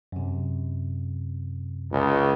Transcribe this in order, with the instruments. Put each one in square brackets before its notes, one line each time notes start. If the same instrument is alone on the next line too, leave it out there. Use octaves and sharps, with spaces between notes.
[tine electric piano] F#2 C3
[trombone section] C#2